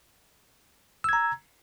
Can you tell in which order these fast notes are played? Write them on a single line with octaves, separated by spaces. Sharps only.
E6 G#6 A#5